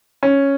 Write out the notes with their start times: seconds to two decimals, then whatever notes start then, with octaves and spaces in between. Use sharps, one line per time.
0.23 C#4